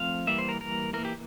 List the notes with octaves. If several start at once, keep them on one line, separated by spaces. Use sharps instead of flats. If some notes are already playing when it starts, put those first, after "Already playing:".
Already playing: F3 A3 C4 F5
E3 G3 A#3 E5
C5
A#4
A#4
E3 A#3 A#4
G4